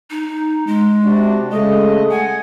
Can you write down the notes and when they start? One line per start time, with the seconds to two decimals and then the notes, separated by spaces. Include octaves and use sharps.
0.10 D#4
0.67 G#3
1.04 C3 D4 F#4
1.52 C#3 G#3 A3 D#5
2.11 F#5 G#5